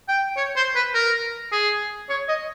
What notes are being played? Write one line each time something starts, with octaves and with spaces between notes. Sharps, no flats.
G5
C#5
C5
B4
A#4
G#4
C#5
D#5